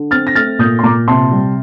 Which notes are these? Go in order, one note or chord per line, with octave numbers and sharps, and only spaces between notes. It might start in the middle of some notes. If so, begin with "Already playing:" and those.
Already playing: D3
C4 F6 A6
A#6
A3 F6 A6
A#2 D#6 G6
C6
A#2 A#5 D6
C3 A5 C6
G3